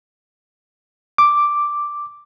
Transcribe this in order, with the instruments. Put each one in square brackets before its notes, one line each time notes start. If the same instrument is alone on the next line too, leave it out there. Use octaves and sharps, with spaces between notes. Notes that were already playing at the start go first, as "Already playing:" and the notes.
[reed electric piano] D6